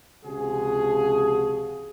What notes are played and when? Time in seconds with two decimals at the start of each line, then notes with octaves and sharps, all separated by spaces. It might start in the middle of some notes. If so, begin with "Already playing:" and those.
0.24 C#2 C3 F3 F#4 G#4